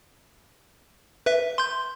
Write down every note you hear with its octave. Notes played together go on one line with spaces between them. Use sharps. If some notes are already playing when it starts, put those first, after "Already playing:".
B4 E5
C6 G6